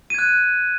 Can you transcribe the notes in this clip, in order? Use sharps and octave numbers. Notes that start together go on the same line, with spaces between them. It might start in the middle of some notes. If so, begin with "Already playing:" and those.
F#6 G#6 D#7